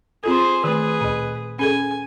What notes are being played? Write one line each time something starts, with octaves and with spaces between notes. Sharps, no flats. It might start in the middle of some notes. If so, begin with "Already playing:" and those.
C4 F4 G#4 A4 C5
D#3 A3 G#4 B4
D2 A#2
C#4 G#4 A4 G#5